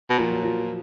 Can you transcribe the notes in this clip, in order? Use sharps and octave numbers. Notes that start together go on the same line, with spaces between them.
B2
A#2 F3
F#3
F3